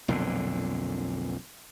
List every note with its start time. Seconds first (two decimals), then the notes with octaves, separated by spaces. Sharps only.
0.08 B1 F2 A#2 D3